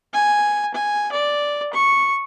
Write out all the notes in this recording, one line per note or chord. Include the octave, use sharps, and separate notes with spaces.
G#5
G#5
D5
C#6